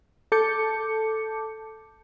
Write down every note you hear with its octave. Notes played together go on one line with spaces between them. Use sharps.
A4 A5 D6 G6 C#7